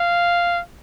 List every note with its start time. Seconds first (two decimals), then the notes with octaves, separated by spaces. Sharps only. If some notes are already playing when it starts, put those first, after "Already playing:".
Already playing: F5